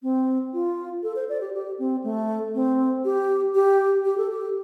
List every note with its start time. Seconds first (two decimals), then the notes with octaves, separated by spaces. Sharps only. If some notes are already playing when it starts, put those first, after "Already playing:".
0.03 C4
0.53 F4
1.03 A4
1.16 C5
1.29 D5
1.41 G4
1.54 G4
1.79 C4
2.04 A3
2.54 C4
3.05 G4
3.55 G4
4.05 G4
4.18 A4
4.30 G4